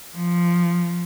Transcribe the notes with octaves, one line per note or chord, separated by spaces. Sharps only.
F3